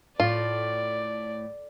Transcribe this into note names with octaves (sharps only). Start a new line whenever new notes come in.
A2 F4 D5